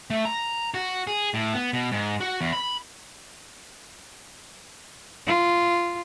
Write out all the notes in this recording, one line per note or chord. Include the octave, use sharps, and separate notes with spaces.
A3
A#5
F#4
G#4
A2
B3
B2
G#2
F#4
E2
B5
F4